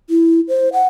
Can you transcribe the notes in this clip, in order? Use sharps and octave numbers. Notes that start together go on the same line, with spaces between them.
E4
C5
F#5